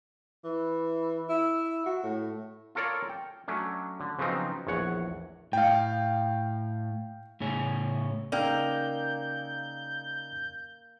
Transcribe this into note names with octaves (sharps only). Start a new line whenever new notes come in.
E3
E4
F#4
A2
F4 A4 A#4 C#5 D5 F5
G5
F#3 A3 C#4 D4
D3
C#3 F3 F#3 B3 C4 D#4
A#1 E2 C#5 F#5
A2 F5 G5
A2 C#3 C#4
C#3 A#3 D#4 D5 G5 E6 G6